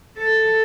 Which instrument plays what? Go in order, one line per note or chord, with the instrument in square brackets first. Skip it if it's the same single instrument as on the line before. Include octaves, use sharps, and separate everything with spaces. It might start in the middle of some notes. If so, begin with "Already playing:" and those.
[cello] A4